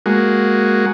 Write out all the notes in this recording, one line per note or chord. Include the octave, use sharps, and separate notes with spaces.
G#3 A#3 F#4